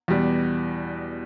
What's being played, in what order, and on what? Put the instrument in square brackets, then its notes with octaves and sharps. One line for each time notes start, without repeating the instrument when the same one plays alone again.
[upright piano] E2 B2 G3